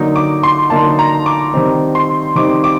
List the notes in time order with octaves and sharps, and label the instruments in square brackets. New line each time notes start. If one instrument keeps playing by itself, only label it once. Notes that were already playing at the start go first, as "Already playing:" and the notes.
Already playing: [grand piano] D3 F#3 A#3 D#4
D6
C6
D3 F#3 A#3 D#4 A5
A#5
D6
D#3 G3 C4 D#4
C6
D#3 G3 C4 D#4 D6
D6